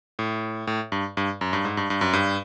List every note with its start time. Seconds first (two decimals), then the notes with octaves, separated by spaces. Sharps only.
0.19 A2
0.67 A2
0.92 G2
1.17 G2
1.41 F#2
1.53 G2
1.65 G#2
1.77 G2
1.90 G2
2.01 F#2
2.13 G2